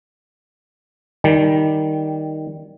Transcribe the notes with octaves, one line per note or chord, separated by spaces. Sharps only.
D#3 G3